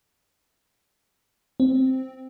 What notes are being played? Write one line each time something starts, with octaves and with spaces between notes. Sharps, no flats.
C4